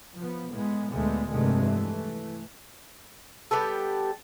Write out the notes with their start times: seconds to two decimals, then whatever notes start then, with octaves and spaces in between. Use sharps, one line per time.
0.17 F3 B3
0.53 A2 G#3 B3
0.93 D2 A#2 G#3 A3 B3
1.31 F1 G2 C3 D#3 G#3 A3
1.63 E3 A3
3.51 G3 B3 G4 A4